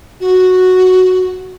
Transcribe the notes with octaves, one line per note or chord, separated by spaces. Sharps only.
F#4